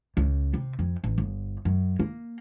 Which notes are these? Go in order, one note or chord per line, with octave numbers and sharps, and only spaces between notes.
C#2
C3
F2
A1
G1
F#2
A#3